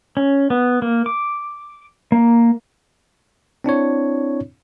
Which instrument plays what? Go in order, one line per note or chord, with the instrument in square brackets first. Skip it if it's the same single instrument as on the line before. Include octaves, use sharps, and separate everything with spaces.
[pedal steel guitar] C#4
B3
A#3
D6
A#3
[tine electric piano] C4 D4 E4 C#5